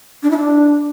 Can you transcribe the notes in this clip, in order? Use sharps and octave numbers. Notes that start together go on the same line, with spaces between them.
D4
E4
D4